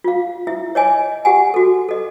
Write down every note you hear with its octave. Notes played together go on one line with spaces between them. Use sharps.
F4 F5
E4 E5
C#5 D#5 G#5
G4 F#5 G#5
F#4 A4
A4 D#5